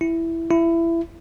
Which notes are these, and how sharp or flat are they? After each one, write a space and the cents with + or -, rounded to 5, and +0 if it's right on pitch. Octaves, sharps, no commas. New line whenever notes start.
E4 +5
E4 +20